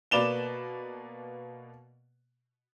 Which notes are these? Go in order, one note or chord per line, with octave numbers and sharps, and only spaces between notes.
B2 A#3 B4 D5 E7 G7